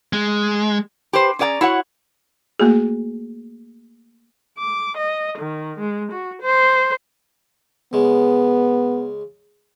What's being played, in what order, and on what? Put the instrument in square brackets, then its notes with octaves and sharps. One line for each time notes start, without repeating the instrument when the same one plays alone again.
[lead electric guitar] G#3
[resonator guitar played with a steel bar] G4 B4 C5
C#4 G#4 D5 F5 A#5
E4 F#4 C#5 F#5
[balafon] A3 A#3 F#4 G#4
[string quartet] D6
D#5
D#3
G#3
F#4
C5
[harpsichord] C#3 G#3 [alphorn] B3